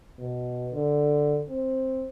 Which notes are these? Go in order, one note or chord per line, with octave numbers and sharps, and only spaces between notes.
B2
D3
C4